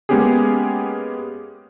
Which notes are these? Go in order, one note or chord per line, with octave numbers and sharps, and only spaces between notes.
G#3 A#3 B3 C#4 G4 G#4